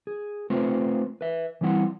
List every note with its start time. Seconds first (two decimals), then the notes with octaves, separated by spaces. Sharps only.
0.07 G#4
0.50 A3 C4 F4 B4 C5
1.21 B4 E5
1.61 E3 G3 C4 E4 F#5 C6